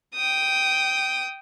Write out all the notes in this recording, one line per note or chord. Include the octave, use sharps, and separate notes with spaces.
G5 D#6